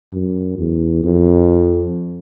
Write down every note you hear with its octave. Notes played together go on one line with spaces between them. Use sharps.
F#2
E2
F2